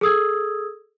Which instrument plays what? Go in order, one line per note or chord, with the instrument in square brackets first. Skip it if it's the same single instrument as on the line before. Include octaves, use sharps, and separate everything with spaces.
[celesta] G#4 A4 D#6 E6 G#6